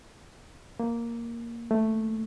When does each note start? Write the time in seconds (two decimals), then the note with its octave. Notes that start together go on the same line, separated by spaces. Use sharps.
0.80 A#3
1.71 A3